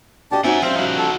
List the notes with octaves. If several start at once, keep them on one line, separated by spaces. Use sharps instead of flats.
D4 F#4 G4 D#5 A5
C4 C#4 D#4 F#4 E5 F#5 G#5
F3 G3 C4 C#4 E5 F5
D#4 F#4
A4